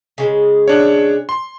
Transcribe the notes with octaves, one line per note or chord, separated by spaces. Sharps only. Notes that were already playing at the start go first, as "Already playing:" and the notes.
C#3 G#3
D4 C#5
C6